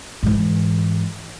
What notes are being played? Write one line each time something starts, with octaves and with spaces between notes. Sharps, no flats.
G#2 E3